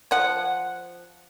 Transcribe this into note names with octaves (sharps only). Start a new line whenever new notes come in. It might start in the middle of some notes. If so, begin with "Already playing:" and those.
F3 F#5